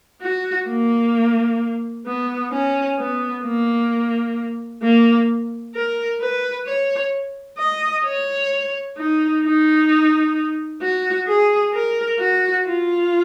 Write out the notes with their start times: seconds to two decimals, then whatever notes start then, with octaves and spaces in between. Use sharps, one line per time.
0.22 F#4
0.68 A#3
2.06 B3
2.52 C#4
2.99 B3
3.44 A#3
4.82 A#3
5.75 A#4
6.21 B4
6.67 C#5
7.59 D#5
8.05 C#5
8.97 D#4
9.43 D#4
10.82 F#4
11.27 G#4
11.74 A#4
12.19 F#4
12.66 F4